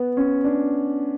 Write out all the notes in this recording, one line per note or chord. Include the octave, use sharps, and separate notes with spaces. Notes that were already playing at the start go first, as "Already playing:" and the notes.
Already playing: B3
C#4
D4